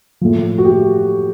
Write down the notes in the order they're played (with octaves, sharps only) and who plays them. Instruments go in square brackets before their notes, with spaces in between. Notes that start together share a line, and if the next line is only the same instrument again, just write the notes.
[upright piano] A2 F3
F#4
G4